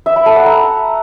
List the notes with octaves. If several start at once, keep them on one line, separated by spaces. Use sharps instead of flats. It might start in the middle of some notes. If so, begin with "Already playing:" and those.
E5
B5
A4
F#5
A#5